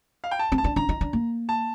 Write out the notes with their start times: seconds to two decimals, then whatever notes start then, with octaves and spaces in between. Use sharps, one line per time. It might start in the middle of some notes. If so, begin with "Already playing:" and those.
0.24 F5
0.31 G5
0.39 A5
0.52 C4
0.58 A5
0.64 D4
0.76 D4 A#5
0.89 D#4
1.01 D4
1.13 A#3
1.49 A5